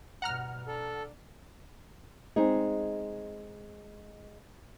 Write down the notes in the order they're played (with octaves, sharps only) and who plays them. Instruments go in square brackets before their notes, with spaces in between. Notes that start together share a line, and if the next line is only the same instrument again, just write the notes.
[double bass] G2 B2 [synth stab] F#5 A#5 F6
[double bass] D4 [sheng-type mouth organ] A4
[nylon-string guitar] G#3 C4 D#4 G#4